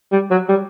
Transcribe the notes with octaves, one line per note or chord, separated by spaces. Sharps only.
G3
F#3
G3